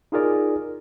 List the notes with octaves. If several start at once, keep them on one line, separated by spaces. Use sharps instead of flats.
D#4 F4 G#4 A#4 D5